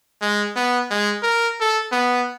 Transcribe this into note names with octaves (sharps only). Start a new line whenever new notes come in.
G#3
B3
G#3
A#4
A4
B3